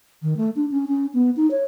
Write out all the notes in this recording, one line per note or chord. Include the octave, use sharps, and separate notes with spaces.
D#3
A3
D4
C#4
C#4
B3
D#4
C#5